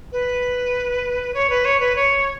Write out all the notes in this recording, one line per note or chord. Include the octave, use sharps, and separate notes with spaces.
B4
C#5
B4
C#5
B4
C#5